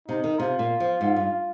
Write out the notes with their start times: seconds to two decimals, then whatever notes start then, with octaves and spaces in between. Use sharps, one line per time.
0.08 C3 D#4
0.24 D#3
0.39 C3 F4
0.59 A#2
0.80 F3
1.01 G#2
1.16 G2